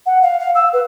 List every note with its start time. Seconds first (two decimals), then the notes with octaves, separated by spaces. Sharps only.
0.06 F#5
0.22 F5
0.39 F5
0.55 E6
0.73 B4